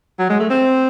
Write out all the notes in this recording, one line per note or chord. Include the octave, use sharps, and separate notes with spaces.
F#3
G#3
A3
C4